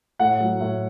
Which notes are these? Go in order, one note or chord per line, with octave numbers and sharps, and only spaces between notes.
A2 F#5
F#3
A2